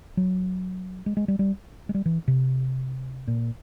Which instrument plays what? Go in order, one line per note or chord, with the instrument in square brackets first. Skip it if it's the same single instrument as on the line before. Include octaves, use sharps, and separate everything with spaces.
[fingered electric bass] F#3
G#3
G#3
G3
G3
G#3
G3
E3
C3
A#2